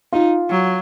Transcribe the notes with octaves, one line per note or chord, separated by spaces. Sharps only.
D#4 F4
F#3